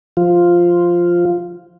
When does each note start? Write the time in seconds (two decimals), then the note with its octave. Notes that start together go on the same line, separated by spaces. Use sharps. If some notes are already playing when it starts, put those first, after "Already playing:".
0.17 F3 F4